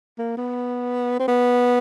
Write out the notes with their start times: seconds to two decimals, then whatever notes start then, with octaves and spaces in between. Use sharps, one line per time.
0.19 A#3
0.37 B3
1.19 C4
1.28 B3